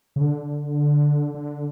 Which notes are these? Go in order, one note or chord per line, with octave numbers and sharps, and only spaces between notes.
C#3
D3
D3